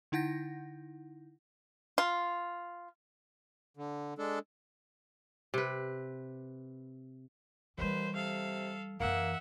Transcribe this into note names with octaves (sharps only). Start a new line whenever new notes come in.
D3 D#4 E4 F#5 G6 A#6
F4
D3
G#3 D4 A4
C3 B4
D#2 E3 G3 B4 C5
C3 A4 F5
F#2 E3 A#3 E5 F#5